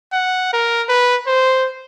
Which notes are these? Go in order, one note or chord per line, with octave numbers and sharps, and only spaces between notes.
F#5
A#4
B4
C5